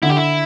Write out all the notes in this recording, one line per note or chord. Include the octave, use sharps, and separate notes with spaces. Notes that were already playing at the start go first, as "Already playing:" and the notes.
D3 E4
G4
E4